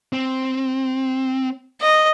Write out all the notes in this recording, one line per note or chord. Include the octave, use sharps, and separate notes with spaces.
C4
D#5